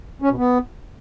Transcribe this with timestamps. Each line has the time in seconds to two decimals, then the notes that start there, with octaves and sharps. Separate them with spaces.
0.22 C#4
0.30 B2
0.37 B3